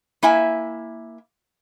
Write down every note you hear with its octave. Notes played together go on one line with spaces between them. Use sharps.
A#3 E4 E5 G#5